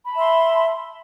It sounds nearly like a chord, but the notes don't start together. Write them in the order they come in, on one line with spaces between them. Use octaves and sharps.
B5 A5 E5 C6